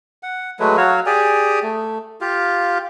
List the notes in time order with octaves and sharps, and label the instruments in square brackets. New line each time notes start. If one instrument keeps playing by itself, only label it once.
[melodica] F#5
F#3 G#3 A3 B4
F#3 F#4 C#5 F5
G4 G#4 D5 G#5
A3
F4 G4 F5